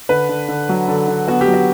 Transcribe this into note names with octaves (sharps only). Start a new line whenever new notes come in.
D3 B4
D3
D3
F#3
D3 A4
D3
B3 F#4
G4
F#3
F#4